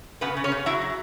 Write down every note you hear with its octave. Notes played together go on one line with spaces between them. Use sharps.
C#3 B3 B4
C#3
C#4 C#5
C#3
F#3 E4 E5
F#3